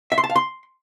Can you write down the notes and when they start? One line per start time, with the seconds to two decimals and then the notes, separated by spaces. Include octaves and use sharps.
0.12 E5
0.18 C6
0.24 A5
0.30 F5
0.36 C6